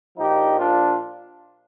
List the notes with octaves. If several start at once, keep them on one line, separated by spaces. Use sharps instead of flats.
A#1 A#2 F3 D#4 G4
D4 F4